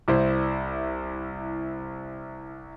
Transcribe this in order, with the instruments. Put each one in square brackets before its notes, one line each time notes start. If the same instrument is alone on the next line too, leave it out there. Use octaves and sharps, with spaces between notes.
[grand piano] C2 E4 C5